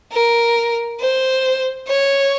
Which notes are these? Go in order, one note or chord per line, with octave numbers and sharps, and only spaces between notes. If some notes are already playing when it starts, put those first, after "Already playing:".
A#4
C5
C#5